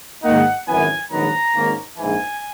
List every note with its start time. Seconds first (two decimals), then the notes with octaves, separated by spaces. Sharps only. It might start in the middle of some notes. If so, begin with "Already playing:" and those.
0.24 G#2 D#3 A#3 D#4 F#5
0.67 G#1 F#2 E3 B3 G#5
1.10 A#1 G#2 D#3 F#3 B3 A#5
1.54 G#1 G#2 D#3 A#3 C#4
1.97 A#1 G#2 E3 G#5